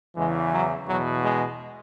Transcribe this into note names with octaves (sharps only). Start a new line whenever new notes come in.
E2 C#3 E3 G#3
F#3
E2 B2 F#3
G#3